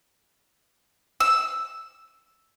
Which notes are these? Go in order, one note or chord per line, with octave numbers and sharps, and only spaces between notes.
E6